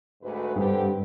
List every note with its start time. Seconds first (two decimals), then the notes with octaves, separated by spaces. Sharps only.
0.22 D2 G#2 B4
0.56 G2 D3 C4 G4